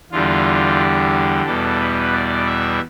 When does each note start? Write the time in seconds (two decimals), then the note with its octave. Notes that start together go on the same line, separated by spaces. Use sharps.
0.12 E2 D3 G3 F4
0.79 G4
1.45 E2 B2 G3 A4
1.80 B4
2.12 D5
2.46 E5